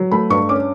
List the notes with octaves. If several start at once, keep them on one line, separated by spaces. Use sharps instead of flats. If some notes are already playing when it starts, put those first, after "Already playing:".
Already playing: F#3
A3 B5
G2 C#6
C#4 D6